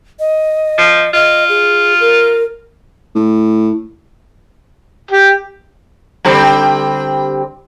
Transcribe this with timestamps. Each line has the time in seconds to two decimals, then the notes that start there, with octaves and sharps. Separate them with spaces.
0.20 D#5
0.78 F3
1.14 F4 D#5
1.49 G#4
2.00 A#4
3.15 A2
5.11 G4
6.25 D3 G3 C4